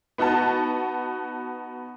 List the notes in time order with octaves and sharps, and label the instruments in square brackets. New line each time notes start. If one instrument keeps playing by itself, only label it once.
[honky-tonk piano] B3 D#4 F#4 F#5 A5